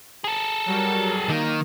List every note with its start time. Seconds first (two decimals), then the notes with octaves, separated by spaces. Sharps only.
0.24 G#4 A4
0.66 F#3 G3 A#4
1.29 D#3 A#3